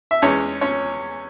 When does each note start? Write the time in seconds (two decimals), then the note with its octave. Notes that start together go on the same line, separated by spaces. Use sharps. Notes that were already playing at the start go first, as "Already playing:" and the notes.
0.11 E5
0.22 E2 E3 G#3 C#4 C#5
0.61 C#4 C#5